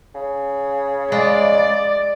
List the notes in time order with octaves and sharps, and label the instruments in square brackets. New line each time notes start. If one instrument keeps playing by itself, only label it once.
[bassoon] C#3
[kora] G#3 [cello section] D5